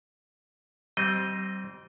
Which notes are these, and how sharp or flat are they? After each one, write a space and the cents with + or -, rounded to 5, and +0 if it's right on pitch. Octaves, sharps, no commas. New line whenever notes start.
G3 -35 C4 +0 D#5 +0